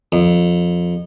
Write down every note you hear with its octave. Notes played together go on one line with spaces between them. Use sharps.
F2